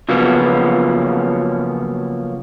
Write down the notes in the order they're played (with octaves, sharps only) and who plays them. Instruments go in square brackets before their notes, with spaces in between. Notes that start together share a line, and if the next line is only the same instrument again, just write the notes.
[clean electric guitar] C#3 F3 F#3 A#3 B3 C#4